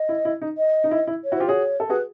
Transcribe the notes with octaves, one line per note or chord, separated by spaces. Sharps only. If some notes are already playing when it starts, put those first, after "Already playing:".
Already playing: D#5
E4
E4
D#4
D#5
D#4
E4
E4
C#5
E4 F#4
F4 G4 C5
F#4 G#4 C#5
A4
F#4 G#4 B4